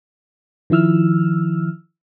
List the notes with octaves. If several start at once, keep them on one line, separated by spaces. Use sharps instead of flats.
D#3 F3 E4 E6 F6